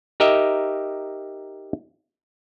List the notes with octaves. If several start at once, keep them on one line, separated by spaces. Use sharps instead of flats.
D#4 G4 A#4 D#5 E5